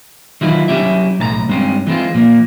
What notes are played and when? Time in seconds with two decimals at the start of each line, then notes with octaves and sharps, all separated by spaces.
0.41 D#3 E3 F#3 E4 F4
0.68 F#3 C#4 E4 G4 E5
1.19 B1 A2 A5 A#5
1.48 G2 G#3 C4 C#4
1.87 E3 G#3 C4 F4
2.14 A#2 F3 G#3 A#3